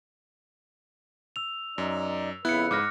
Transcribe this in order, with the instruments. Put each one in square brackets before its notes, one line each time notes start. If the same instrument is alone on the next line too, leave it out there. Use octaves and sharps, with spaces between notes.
[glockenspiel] E6 F7
[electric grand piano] F#2 [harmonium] D#4 D5
[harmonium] F2 C#3 B4 [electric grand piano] B3 E4 [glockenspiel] F#6 C#7
[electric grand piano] G#2 [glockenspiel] D6 F6 A#6